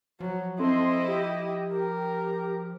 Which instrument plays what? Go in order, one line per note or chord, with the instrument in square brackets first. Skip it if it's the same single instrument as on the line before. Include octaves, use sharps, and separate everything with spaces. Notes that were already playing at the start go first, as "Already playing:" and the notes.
[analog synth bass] F3 [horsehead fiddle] F#3
[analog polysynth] C4 A4 C6 [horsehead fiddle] E4 D#5
[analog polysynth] G4
[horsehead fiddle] A#4